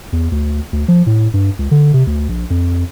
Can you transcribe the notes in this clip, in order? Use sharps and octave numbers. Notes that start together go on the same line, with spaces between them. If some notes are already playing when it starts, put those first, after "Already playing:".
E2
D2
D2
F3
A2
G2
C#2
D3
C3
D2
A#1
F2